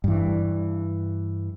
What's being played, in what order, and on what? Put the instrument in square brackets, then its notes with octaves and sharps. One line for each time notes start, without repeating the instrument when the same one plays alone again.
[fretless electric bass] G2 E3